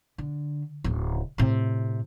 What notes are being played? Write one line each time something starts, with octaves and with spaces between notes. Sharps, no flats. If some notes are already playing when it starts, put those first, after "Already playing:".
D3
D1 C#3
A2 C3